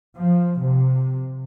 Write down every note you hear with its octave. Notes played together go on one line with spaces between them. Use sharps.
F3
C3